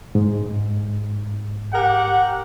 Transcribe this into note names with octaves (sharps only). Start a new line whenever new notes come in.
G#2
G4 A#4 F#5